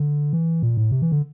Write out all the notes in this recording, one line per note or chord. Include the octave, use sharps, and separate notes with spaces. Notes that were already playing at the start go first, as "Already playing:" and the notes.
Already playing: D3
E3
A#2
A2
C3
E3
D3